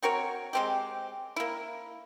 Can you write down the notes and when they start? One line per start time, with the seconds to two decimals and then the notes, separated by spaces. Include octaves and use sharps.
0.03 C4 F#4 A#4 C#5
0.53 G#3 C4 G4
1.36 A#3 E4